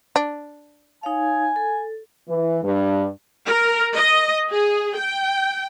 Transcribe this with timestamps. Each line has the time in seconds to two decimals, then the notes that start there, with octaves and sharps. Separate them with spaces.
0.16 D4
1.03 D#4 C#5 F5 G#5
1.56 A4
2.28 E3
2.63 G2
3.46 A#4
3.94 D#5
4.49 G#4
4.96 G5